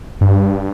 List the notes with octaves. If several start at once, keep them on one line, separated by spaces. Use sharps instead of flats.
G2